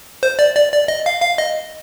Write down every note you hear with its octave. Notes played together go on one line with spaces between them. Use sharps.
C5
D5
D5
D5
D#5
F5
F5
D#5